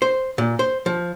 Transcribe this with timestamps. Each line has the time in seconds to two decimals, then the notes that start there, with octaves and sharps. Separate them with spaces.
0.02 C5
0.38 A#2
0.59 C5
0.86 F3